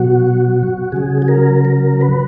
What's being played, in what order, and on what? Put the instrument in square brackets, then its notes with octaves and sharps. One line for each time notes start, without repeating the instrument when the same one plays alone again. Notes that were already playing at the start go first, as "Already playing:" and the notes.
Already playing: [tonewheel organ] B2 F#3 F#4
C#3 F#3 G#4
G#4
A#4
A#4
B4